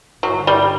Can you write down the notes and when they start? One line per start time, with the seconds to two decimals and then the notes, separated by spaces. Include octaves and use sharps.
0.22 G1 G2 D3 F#3
0.47 G3